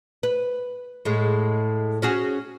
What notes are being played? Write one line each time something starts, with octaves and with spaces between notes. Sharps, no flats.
B4
A2 G#3
C#4 F#4 G#4